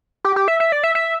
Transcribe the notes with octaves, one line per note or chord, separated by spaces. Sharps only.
G4
G4
E5
E5
D5
E5
E5